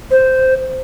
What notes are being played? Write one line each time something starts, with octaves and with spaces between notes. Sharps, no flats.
C5